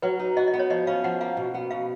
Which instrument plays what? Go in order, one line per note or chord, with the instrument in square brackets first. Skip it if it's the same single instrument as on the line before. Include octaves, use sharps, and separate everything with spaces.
[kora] F#3 [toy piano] B4
[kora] D#4
[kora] F#4 [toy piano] D#5
[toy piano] D#5
[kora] B3
[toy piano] C#5
[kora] F3 [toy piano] D#5
[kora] C#4 [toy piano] F5
[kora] F3 [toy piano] F#5
[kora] A#3 [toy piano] F5
[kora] B2
B3
[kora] B2 [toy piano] F5